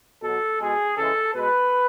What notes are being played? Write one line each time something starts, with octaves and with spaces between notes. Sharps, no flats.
B2 F#3 A4
B2 G#3 G#4
C#3 E3 G#3 A4
B2 G#3 B4